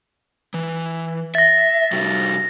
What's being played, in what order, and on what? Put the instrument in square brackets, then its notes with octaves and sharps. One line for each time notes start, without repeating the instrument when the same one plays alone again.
[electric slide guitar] E3
[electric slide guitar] E5 [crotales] A6 A#6
[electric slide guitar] C3 G3 F#4